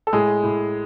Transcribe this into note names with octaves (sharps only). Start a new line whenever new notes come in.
A4
A2 G#3 G#4
A2